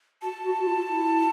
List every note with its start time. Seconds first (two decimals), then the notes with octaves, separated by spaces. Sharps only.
0.22 F#4 A5
0.44 F#4
0.59 F#4
0.67 F4
0.89 E4